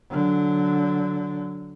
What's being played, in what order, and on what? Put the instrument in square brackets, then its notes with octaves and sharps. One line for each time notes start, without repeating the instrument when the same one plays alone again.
[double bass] D3 F#3